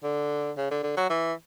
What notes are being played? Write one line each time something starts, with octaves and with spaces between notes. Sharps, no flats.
D3
C#3
D3
D3
F#3
E3